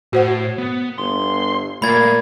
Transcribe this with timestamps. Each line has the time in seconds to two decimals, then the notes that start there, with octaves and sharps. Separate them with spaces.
0.13 A2 F#4 C5 F#5
0.58 B3
0.98 G1 C6
1.82 A#2 A3 A#3 B5 G#6 A6